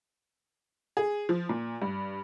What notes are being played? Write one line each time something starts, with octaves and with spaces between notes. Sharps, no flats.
G#4
F3
A#2
G2